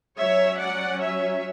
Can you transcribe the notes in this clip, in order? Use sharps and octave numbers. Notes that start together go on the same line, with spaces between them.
F#3 C#4 C#5 E5
D5 F#5
C#5 E5